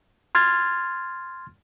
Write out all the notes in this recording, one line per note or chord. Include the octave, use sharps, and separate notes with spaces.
C6 F6 G#6 A6